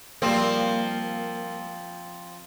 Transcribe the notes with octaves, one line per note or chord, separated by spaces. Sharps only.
F3 G3 A#3 C4